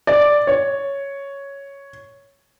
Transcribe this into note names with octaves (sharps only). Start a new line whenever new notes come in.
D5
C#5